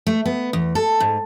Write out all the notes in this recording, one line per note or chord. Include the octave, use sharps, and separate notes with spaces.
A3
B3
E2
A4
G#2